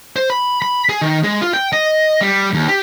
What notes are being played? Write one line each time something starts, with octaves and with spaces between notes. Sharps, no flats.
C5
B5
B5
G#4
D#3
G#3
F4
G5
D#5
G3
D#2
G4